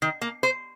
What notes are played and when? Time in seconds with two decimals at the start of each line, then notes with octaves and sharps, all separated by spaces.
0.02 D#3
0.21 A#3
0.43 C5